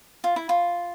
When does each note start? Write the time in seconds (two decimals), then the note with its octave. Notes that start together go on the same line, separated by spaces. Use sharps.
0.24 F4
0.36 E4
0.49 F4